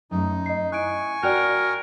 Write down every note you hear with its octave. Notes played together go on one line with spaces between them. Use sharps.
F#2 A3 D#4
D#5 C7
E4 G#5 C#6 F#6 D7
F#4 A#4 D5 G5 F#6